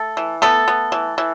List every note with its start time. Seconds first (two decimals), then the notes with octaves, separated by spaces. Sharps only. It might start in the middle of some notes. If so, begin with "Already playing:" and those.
Already playing: A3 A4
0.17 E3
0.42 A3 B3 A4
0.68 B3
0.92 E3
1.18 E3